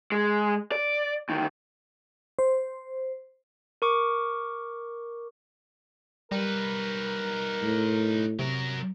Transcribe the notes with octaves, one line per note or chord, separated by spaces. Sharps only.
G#3
D5
D2 D#3
C5
A#4 C#6 D6
G3 D#4 A#4 B4
A2
C3 F#3 A#4